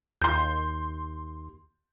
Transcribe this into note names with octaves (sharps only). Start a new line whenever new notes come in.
D#2 C6 G6